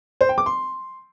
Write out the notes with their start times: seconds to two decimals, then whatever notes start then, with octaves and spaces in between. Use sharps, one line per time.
0.21 C5
0.29 G5
0.38 D6
0.46 C6